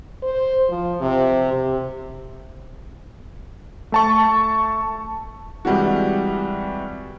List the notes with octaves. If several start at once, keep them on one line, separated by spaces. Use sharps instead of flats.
C5
F3
C3
C3
A3 A5 C#6
C3 E3 G3 G#3 F#4